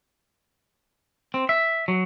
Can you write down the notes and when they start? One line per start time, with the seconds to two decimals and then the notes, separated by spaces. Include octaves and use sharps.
1.34 C4
1.49 E5
1.88 F#3